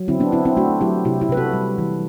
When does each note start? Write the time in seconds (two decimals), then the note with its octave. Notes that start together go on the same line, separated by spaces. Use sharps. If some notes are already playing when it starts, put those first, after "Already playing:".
Already playing: F#3
0.08 D3 C4 E4
0.20 B3 D4
0.32 D3 C4 E4
0.45 C4 E4
0.57 A3 D4 F#4
0.81 F#3 E4 G4
1.05 C3 E4 G4
1.21 E4 G4
1.29 C3 B4
1.37 F#4 A4
1.53 G3
1.78 E3